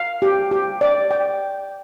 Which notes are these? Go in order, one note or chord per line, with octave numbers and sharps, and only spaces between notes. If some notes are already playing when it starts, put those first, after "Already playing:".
Already playing: F5
G4
G4
D5
G5